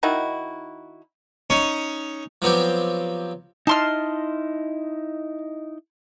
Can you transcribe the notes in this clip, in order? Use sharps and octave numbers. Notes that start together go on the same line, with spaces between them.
D#3 D#4 E4 F#4
C#4 D#4 C#5
F3 F#3 B3 C4 G4
D#4 E4 D#5 A5 C6 F6